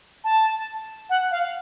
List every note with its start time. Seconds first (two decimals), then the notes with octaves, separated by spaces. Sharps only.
0.24 A5
1.10 F#5
1.31 F5